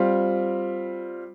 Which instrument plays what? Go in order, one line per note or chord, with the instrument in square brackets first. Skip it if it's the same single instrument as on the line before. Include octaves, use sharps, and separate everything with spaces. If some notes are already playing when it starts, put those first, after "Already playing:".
Already playing: [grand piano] G3 C4 F4